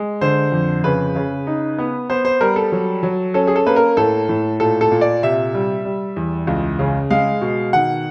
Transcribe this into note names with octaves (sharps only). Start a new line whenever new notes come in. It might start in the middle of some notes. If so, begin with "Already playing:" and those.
Already playing: G#3
D3 C5
F2
C#3 B4
C#3
D#4
B3
B3 C5
C5
G3 A#4
A4
F#3
F#3
C#4 A4
G#4
A4
A#3 B4
A#4
A2 A4
A2
A#2 A4
A4
A#2
D5
C3 E5
G3
G3
E2
C#2
C#3
G#3 F5
B2
D#3 F#5